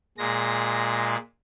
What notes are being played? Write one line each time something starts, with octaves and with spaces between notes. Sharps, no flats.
A#2 G#3 A#6